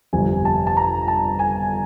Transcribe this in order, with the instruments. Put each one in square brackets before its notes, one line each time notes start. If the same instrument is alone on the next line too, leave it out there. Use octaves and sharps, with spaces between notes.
[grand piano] G1 F2 C3 G#5
A5
A5
A#5
A5
G#5